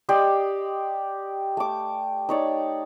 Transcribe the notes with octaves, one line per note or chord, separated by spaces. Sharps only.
G4 D5 D#5 C6
A3 D6
D#4 C#5 D5